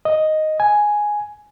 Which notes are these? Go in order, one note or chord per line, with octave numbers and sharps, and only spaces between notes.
D#5
G#5